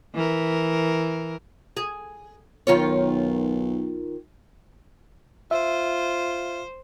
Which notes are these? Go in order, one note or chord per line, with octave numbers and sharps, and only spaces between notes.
E3 A#4
G#4
B1 D#3 F4 C#5
F4 C5 E5